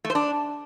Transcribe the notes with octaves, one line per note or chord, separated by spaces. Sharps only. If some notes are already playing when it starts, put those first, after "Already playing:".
A3
C5
D4